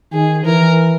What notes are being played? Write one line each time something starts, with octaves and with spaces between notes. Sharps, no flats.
D#3 G#4
E3 A#4